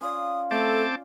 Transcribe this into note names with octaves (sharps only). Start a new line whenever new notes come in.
C#4 F4 D5 D#6
A3 C4 A4 A5 D6